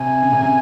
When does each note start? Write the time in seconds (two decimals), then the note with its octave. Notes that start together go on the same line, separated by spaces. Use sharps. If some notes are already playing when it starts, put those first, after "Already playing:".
Already playing: C3 G#5
0.22 C#3
0.32 C3
0.42 C#3